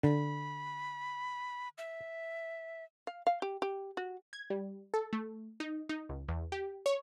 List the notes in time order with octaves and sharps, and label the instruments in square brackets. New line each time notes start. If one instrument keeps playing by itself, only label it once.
[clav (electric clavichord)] D3 [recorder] B5
[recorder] E5
[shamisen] F5
F5
G4
G4
F#4
[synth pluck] G#6
G3
A4
A3
D#4
D#4
C#2
E2
G4
C#5